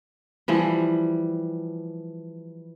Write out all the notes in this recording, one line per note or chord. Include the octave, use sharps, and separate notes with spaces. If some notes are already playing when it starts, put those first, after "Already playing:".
E3 F3 G3